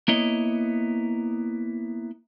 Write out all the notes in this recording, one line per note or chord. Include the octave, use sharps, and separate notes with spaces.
A#3 B3 E4 C#5 D#5